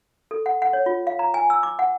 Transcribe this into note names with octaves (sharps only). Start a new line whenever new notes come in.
A4
F#5
F#5
C#5
F4
F5
A#5
G#5
E6
D6
F#5